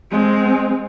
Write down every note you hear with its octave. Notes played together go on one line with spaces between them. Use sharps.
G#3 C4